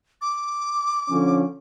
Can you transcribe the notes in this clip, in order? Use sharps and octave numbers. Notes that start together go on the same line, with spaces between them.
D6
D3 F3 C#4